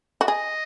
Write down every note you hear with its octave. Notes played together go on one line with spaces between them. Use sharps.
F#4
G#4 D#5